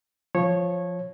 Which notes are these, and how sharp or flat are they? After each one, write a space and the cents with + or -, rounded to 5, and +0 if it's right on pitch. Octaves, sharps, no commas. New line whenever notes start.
F3 +0 C#5 -15